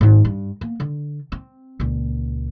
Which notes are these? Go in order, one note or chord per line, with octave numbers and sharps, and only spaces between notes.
D#2 G#2
G2
A#3 B3
D3
C4
C#2 A#2